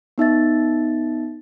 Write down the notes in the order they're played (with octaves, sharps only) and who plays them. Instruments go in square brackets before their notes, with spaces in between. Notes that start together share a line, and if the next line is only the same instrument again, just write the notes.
[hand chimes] B3 D#4 E5 A6